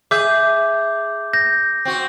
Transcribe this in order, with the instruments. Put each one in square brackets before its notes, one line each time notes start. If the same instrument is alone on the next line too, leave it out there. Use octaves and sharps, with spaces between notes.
[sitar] G#4 E5 [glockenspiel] D6 G6
[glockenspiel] G6 A#6
[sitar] C4 F#4